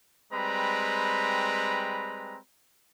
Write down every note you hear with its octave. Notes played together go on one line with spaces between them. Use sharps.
G3 G#3 C4 B4 A#5 B5